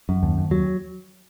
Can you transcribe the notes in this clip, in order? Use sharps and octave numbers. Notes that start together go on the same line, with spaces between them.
F#2
D#2
D#2
F#3